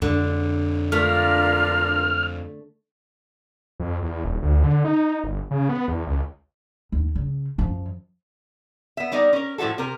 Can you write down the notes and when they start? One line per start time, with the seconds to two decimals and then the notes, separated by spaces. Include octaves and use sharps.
0.02 F2 D3 G#3
0.92 A3 D4 F4 A#4 F6
3.80 F2
4.02 E2
4.24 D#1
4.42 D2
4.64 D3
4.85 D#4
5.24 G1
5.51 C#3
5.69 B3
5.88 E2
6.07 C#2
6.92 D#2
7.16 C#3
7.58 F#2 F3
8.97 B3 E5
9.12 G3 B3 D#4 A#4 D5
9.33 C#4 A#4
9.58 A2 F3 E4 F#4 A4
9.78 C3 A#4